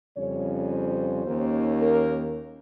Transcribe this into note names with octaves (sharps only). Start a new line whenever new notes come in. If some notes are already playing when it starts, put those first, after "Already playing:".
F2 C#3 G3 C#4 C#5
C5
D#2 D#3 A#3 C#4
A#4